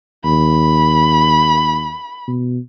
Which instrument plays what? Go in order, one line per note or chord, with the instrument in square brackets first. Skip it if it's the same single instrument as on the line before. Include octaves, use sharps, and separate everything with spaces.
[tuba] D#2 [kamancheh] B5
[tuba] B2